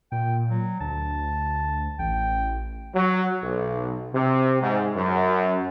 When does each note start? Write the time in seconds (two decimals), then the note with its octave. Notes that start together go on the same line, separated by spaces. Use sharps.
0.12 A#2 G5
0.50 F#3
0.81 D2 A5
1.99 A1 G5
2.95 F#3
3.42 B1
4.14 C3
4.62 G#2
4.95 F#2